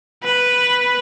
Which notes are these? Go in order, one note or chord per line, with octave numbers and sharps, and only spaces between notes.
B4